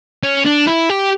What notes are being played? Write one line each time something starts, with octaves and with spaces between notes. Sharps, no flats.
C#4
D4
E4
G4